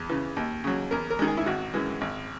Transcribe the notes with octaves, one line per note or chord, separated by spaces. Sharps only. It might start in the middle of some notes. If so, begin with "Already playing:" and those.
Already playing: E2
C#3 E3
D#2
C#3 F#3
E2 A#4
A#4
D#3 G#3
G#4
E4
G#1 F#4
F#2 E3 G#3
G#1